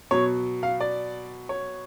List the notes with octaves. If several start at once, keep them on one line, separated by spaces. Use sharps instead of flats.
B2 F#3 C#5
F5
D5
C#5